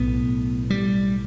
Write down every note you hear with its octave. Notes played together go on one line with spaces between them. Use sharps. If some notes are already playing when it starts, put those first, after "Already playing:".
Already playing: B1 A2 B3
G3